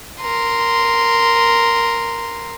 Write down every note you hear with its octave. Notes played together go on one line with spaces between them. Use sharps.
A#4 C6